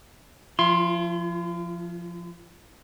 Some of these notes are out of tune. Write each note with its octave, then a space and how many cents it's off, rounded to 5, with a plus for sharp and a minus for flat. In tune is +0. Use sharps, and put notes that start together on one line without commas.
F3 +0 F4 -45 C6 +20